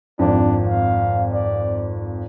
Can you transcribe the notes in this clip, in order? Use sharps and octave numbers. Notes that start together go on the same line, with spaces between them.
G#1 F2 D4
F5
D5